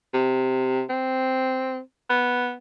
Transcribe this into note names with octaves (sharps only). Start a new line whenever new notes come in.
C3
C4
B3